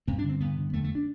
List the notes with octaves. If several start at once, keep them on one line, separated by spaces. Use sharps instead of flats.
G2 C4
D4
D3
C4
G2 B3
D3
F2 A3
A3
D4